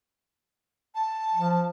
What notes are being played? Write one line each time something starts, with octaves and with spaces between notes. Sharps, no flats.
A5
F3